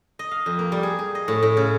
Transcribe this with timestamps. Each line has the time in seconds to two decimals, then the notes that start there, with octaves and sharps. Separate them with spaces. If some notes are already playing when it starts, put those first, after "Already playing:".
0.19 D#5
0.31 F5
0.46 F2
0.59 A#3
0.72 G3
0.83 G#4
0.99 G#4
1.15 D#5
1.28 A2
1.43 A2
1.57 C#3